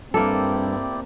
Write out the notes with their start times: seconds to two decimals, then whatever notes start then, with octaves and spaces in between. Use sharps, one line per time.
0.14 G2 A#3 C4 E4 G4 A4 D5